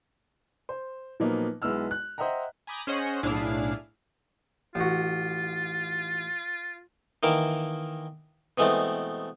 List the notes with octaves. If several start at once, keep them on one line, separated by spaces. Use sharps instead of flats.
C5
A#2 F3 F#3 A#3 B3 D#4
B1 G#3 B3 E4 E6 F6
F#6
C5 D#5 E5 F#5 G5 A#5
G#5 A#5 B5 D6 D#6 G6
C#4 G#4 C5 C#5 D#5 F#5
B1 A2 D4 E4 G#4 F5
A1 F4 F#4
D#3 E3 A#3 D6
B2 E3 G#3 A3 C4